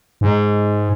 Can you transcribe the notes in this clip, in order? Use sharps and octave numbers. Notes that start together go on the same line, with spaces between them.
G#2